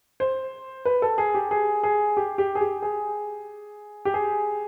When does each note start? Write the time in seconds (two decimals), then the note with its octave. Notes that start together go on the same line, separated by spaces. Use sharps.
0.20 C5
0.85 B4
1.02 A4
1.18 G#4
1.35 G4
1.51 G#4
1.83 G#4
2.17 G4
2.38 G4
2.55 G#4
2.61 G4
2.82 G#4
4.05 G4
4.14 G#4